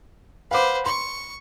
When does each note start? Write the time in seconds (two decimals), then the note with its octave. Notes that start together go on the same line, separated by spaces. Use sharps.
0.51 B4 C5 F5 F#5 D6
0.86 C6 C#6